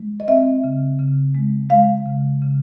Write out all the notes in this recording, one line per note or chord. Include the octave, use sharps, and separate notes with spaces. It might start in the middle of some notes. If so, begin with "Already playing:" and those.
Already playing: G#3
D#5
C4 E5
C#3
C#3
G#3
G#3 F5
C#3
C#3